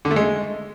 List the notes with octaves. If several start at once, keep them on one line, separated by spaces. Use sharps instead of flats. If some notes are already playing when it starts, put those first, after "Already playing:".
D3
A3
G#3